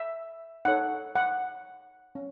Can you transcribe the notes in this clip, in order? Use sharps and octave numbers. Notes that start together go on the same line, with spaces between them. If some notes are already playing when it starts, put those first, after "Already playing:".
Already playing: E5
D#4 A4 C#5 F#5
F#5
C#4